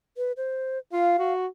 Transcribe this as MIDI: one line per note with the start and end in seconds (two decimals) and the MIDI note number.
0.17 0.32 71
0.37 0.78 72
0.93 1.14 65
0.93 1.33 77
1.19 1.47 66